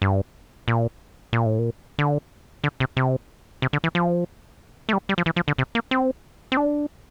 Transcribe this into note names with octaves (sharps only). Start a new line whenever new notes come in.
G2
A#2
A#2
A2
A#2
D3
D3
C3
C3
C3
D3
E3
F3
A3
G3
G3
F3
E3
F3
D3
C3
A#3
C4
C4
D4